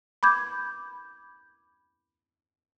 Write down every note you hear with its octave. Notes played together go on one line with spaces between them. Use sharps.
B5 D6 G6 G#6